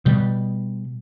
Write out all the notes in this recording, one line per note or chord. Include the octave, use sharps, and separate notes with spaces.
B2 G3